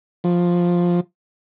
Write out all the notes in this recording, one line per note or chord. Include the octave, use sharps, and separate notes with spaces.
F3